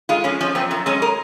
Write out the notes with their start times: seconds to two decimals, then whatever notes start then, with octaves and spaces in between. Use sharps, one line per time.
0.09 G#3 F4
0.24 F3 C#4
0.40 F3 C#4
0.55 F#2 C4
0.71 F#2 C4
0.86 G#3 C#4
1.02 A#4